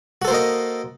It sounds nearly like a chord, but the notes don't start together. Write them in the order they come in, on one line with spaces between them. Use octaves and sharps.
F#4 A4 C5 A#3 D#5